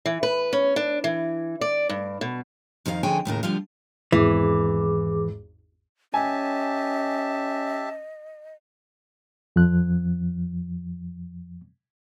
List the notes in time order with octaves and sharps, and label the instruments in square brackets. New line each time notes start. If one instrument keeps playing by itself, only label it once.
[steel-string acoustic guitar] E3
B4
C#4
D4
E3
D5
G2
B2
F2 D#3 D#4 A4 F5
F2 D3 C#4 G#4 G5 G#5
D#2 A2 C#3 A#4
D2 D3 F3 G3 F4 F5
[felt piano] G#1 E2 [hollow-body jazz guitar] E3 [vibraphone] G#4 D6
[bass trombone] C#4 [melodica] G4 E5 A5 [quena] D#5 [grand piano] G#5
[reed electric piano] F2 F3 F#6